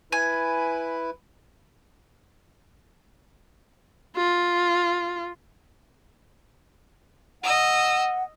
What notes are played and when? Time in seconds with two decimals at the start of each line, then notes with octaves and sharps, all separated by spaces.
0.12 E4 B4 G#5
4.17 F4
7.43 D#5 F#5 E6